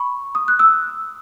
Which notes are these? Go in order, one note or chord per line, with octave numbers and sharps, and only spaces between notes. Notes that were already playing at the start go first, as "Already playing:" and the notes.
Already playing: B5 C#6
D#6
F#6
E6